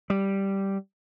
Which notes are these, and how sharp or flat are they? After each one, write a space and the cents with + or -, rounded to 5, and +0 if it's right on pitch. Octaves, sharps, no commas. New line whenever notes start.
G3 -5